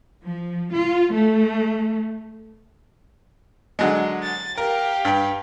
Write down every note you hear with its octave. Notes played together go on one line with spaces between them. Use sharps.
F3
F4
A3
D3 F#3 G#3
A6
G4 A#4 F5
G2 G5